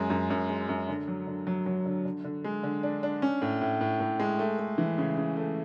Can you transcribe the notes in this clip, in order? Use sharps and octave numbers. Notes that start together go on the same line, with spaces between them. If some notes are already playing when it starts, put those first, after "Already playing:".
Already playing: F#2 G#3
F#2
F#2
G#3
F#2
D3
F#3
D3
F#3
F#3
D3
D3
D3
G#3
D3
D4
D4
C#4
A2
A2
A2
A2
G#3
A3
A3
E3
C#3
C#3
A3